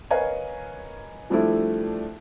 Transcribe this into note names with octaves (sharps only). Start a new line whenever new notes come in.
A#4 B4 C#5 D#5 F5 G#5
F3 G3 A3 D4 E4